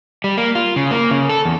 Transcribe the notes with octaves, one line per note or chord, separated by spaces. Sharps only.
G3
A#3
F4
C#3
A#3
C#3
A4
E2